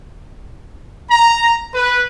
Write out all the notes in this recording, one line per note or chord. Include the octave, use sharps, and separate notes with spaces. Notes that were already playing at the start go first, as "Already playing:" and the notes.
A#5
B4